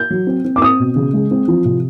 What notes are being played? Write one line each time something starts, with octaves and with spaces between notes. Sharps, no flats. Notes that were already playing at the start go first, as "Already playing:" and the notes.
Already playing: G6
F#3
C4
C4
D6
C4 D#6
B2
C#3
G#3
C4
F3
C3